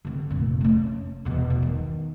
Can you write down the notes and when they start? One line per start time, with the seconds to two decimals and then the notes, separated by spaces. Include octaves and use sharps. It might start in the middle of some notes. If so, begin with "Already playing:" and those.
0.05 D3 C4
0.30 F1 A#2
0.61 A3 C#4
1.25 E2 B2
1.50 E3
1.62 D#3